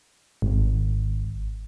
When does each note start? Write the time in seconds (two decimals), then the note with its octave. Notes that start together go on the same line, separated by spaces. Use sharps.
0.42 G#1